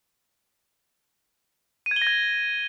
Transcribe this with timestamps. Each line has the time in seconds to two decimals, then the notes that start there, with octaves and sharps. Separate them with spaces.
1.86 D#7
1.91 G#6
1.96 G7
2.02 A#6
2.07 G#6